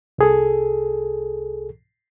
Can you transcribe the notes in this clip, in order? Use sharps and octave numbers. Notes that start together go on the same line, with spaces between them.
C2 G#4 A4